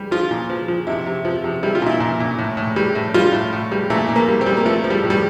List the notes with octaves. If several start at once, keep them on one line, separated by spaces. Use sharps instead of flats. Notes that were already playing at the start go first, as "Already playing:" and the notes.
Already playing: G3
F3 F4
A#2
F3
F3
C3 E4
C3
F3
C3
G3 E4
F4
A#2 E4
A#2
A#2
A2
A2
G3
A2
G3 F4
A2
A2
G3
A#2 A3
A#2
A#3
G3
C4
G3
A#3
F3 A3
F3
G3
A2
G3